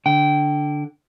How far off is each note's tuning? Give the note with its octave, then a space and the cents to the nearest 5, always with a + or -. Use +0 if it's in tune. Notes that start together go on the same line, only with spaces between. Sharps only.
D3 +0 G5 -25